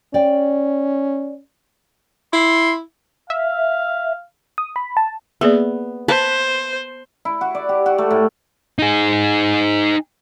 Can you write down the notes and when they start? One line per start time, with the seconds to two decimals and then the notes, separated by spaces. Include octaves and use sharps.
0.14 C#4 D5 G5
2.33 E4 C6
3.30 E5 F5
4.58 D#6
4.76 B5
4.97 A5
5.41 A#3 B3 G#4 D5
6.08 B4 C5 A5
7.25 E4
7.41 F#4
7.55 D5
7.69 G4
7.86 F#4
7.98 A3
8.11 A2
8.79 D#4 G#4